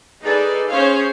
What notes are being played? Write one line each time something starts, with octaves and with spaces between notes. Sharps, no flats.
D#4 G#4 A4 B4 D5
C#4 G#4 C5 C#5 F5